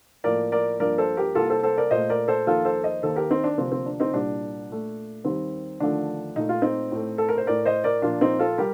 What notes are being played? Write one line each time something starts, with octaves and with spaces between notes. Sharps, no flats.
A2 F3 A#3 A#4 D5
A#4 D5
G2 F3 A#3 A#4 D5
A4 C5
G4 A#4
C2 C3 G3 A#3 F4 A4
A4 C5
A4 C5
A#4 D5
A#2 A3 C5 D#5
A#4 D5
A4 C5
F2 D#3 A#3 F4 A4
A4 C5
C5 D#5
D#2 D#3 A#3 A4 C5
G4 A#4
C4 D#4
D4
D2 C3 F3 A#3 C4
C4
D4
C4 D#4
C2 A#2 G3 A#3 D4
A#2 A3
D#2 D#3 G3 C4
D#2 D3 F3 A3 D4
A#2 A3 D#4
F4
C4 D#4
A2 A3
A4
A#4
C5
A2 A3 A#4 D5
C5 D#5
A#4 D5
A#2 F3 A#3 D4 F4
C4 D#4
F4 A4
G3 G4 A#4